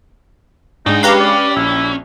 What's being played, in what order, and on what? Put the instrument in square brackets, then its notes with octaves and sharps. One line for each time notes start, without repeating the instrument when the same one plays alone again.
[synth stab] G#2 [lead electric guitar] F#3 G5 [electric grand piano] G#3 D4 [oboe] D#4
[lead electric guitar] C#4 [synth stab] G4 B4 F5 [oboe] A#5
[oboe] D5
[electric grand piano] A#1 [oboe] E4